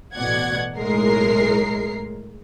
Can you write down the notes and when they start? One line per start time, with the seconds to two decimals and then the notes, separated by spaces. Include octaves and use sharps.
0.14 A1 B2 D5 F#5 G#6
0.76 B1 A2 G#3 A#4 A#5 C7